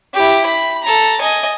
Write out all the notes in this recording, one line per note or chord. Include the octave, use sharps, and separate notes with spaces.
E4 G4
B5
A4 A#5
D#5 G#5